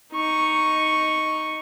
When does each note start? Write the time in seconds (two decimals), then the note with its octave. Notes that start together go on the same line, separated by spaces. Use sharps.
0.14 D#4 C#6